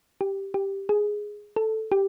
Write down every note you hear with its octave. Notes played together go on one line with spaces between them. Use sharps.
G4
G4
G#4
A4
G4